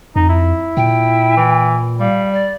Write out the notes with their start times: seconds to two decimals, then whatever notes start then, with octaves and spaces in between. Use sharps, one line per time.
0.16 F2 D#4
0.29 E4
0.77 A#2 G5
1.37 E3
2.00 G3 F5
2.33 D5